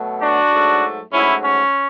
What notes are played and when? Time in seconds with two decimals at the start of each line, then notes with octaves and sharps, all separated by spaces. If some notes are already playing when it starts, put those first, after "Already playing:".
Already playing: B2 F#3 A3
0.21 D4 F#4
0.51 G#2 F#3 A3
1.13 G#2 F#3 A3 C#4 E4
1.44 C#4